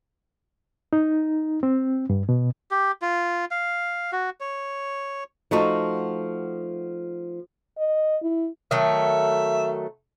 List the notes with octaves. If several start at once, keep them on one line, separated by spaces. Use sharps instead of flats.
D#4
C4
G2
B2
G4
F4
F5
F#4
C#5
F3 A3 D#4 F#4
D#5
E4
D#3 F#3 A3 E5